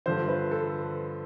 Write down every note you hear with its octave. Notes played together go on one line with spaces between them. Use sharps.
G2 D3 F3 C5
B4
A4